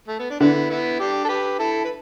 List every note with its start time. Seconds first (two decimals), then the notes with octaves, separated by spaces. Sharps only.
0.08 A3
0.19 B3
0.30 D4
0.40 D3 B3 E4
0.70 B3 E4
0.99 D4 G4
1.25 A4
1.29 G4 B4
1.59 E4 A4
1.84 B4